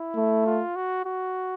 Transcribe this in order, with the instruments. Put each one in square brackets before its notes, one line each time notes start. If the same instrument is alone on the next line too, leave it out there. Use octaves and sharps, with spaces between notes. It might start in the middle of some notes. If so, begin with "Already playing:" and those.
Already playing: [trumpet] E4
[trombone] A3
[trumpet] F4
F#4
F#4